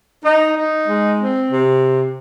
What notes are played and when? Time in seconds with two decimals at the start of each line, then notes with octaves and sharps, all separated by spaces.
0.23 D#4
0.55 D#4
0.86 G#3
1.18 C4
1.50 C3